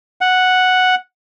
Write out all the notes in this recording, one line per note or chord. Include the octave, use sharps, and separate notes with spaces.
F#5